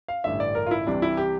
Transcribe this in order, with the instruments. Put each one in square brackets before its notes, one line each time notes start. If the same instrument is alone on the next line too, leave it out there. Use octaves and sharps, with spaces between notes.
[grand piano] F5
A1 G2 D3 E5
D5
A#4
F4
E4
C2 C3 E3 G3 D4
E4
G4